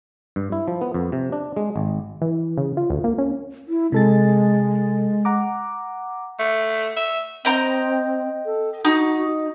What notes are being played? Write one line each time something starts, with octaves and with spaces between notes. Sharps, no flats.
G2
E4
F3
B3
F2
C3
D4
G#3
G#1
E3
C#3
F4
D2
A#3
C#4
E4
C3 G#3 A4 A6
F#5 A#5 D6
A3
E5
C4 D#5 G5 A#5
A4
D#4 F#4